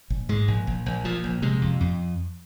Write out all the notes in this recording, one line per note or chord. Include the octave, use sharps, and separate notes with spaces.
A#1
G#2 G#3
A#1
A#1
A#1
A#2 F3
A#1
C3 G#3
F2
F2